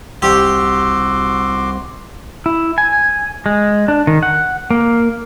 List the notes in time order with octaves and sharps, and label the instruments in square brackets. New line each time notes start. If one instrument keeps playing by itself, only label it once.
[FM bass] C2 [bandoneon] F#4 C6 D6 [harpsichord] G4 [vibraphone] E6
[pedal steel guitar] E4
G#5
G#3
D4
D#3
F#5
A#3